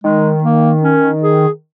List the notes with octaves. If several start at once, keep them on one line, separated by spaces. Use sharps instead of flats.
D#3 G#3
A#3
C#4
G#4